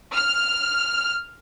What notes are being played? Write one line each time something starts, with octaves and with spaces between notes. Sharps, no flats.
F6